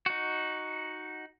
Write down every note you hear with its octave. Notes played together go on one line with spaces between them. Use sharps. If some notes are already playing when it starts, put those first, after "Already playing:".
D#4 F#4